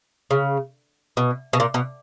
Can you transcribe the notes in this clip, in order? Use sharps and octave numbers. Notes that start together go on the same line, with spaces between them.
C#3
B2
B2
A#2
B2